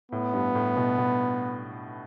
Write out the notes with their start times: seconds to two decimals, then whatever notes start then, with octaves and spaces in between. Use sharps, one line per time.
0.12 A2 B3
0.33 G2
0.55 A2
0.77 B2
0.98 B2